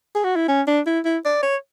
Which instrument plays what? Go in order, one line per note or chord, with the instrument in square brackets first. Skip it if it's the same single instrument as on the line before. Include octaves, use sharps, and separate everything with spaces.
[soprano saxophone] G#4
F#4
E4
C#4
D4
E4
E4
D5
C#5